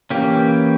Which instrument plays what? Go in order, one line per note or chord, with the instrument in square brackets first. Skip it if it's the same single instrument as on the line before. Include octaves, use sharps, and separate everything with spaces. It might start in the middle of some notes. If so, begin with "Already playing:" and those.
[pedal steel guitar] E3 A#3 C#4 G4